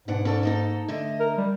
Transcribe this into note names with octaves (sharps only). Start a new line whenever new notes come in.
G#2 B2 D4 F#5
C#4 A4 D5
A#3 D#4 A4
D3 A3 D#5
A#4
G3